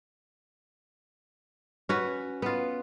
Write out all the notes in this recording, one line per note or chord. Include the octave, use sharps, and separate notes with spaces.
C#4 F#4 B4
B3 F4